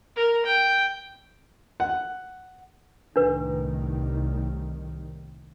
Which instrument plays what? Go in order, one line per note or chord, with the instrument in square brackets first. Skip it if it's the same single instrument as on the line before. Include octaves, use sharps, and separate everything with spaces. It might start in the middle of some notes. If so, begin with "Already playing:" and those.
[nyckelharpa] A#4
G5
[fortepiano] F#5
[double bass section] C2 A2 D#3 [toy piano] D4 B4